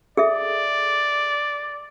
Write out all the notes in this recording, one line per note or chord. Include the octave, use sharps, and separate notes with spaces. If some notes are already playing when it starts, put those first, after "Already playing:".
G#4 A4 D5 E5